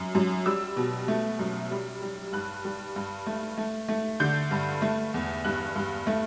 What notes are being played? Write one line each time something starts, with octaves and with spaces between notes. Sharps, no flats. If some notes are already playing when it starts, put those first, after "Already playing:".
Already playing: F#2
F#2
G3 E6
B2
A3
F#2
G3
G3
G2 F#6
G3
G2
A3
A3
A3
D3 G6
G2
A3
E2
G2 F#6
G2
A3